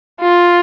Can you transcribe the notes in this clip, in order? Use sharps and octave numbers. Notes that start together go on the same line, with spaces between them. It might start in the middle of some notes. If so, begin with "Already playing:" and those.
F4